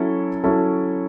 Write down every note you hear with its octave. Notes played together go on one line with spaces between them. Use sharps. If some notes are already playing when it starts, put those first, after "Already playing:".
Already playing: F#3 C#4 E4 A4
F#3 C#4 E4 A4